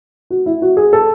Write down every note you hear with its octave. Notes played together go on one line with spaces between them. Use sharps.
F#4
E4
F#4
G#4
A4